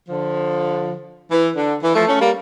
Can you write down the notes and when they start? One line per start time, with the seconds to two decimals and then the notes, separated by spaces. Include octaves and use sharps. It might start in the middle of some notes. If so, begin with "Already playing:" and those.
0.09 D3 F3
1.30 E3
1.56 D3
1.82 E3
1.95 F3 A3
2.07 A3 C#4
2.20 G3 A#3